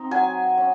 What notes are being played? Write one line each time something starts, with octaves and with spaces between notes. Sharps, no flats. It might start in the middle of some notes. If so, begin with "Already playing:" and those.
Already playing: C4 D#4
F#3 G#5
C#4